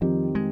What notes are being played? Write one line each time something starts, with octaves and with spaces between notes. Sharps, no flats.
F2 D#3 F3 G3 C4 G4
G#3